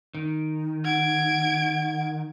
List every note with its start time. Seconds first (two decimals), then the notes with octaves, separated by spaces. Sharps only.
0.15 D#3
0.85 F#5 G#6 D7